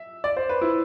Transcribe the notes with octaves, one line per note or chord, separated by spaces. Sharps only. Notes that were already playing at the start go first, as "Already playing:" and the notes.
Already playing: E5
D5
C5
B4
E4